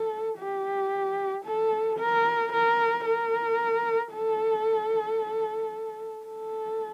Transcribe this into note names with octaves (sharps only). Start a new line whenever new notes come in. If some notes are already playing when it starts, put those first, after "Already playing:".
Already playing: A4
G4
A4
A#4
A#4
A#4
A4
A4